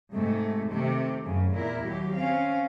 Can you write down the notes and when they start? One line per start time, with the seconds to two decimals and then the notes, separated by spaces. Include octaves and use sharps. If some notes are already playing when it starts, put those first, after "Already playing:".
0.14 G#2 C3 A3
0.72 C3 D#3 A3 G4
1.25 F#2 C#3
1.54 E2 A#2 E4 A#4
1.85 D#2 F#3 G4
2.16 C4 C#4 F5